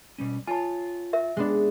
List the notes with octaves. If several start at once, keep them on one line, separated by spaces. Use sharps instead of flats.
B2 G3 C#4
F4 C#5 G#5 A5
A#4 E5
G#3 B3 D4